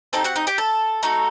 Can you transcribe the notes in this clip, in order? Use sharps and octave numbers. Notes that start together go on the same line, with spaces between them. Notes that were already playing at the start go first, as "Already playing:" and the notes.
C4 D#4 G4 A4 A5
F#4 F#5
D#4 D#5
G4 G5
A4 A5
A3 D#4 F#4 A4